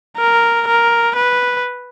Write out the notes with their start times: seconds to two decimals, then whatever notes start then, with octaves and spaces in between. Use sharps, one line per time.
0.18 A#4
0.67 A#4
1.16 B4